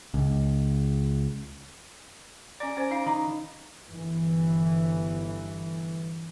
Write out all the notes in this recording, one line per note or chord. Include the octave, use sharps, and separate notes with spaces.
C#2
C#4 D5 A#5 D6
C#4 C5
D#4 F5
D#3 D#4 A#5 B5
G1 E3